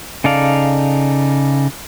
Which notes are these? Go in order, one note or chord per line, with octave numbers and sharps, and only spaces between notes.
C#3 D#4 A4 D5 F5